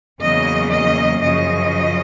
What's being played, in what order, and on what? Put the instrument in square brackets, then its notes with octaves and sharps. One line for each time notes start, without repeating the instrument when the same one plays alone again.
[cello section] E2 C#3 F#3 A#3 D#5
D#5
F#2 C#3 F3 D#5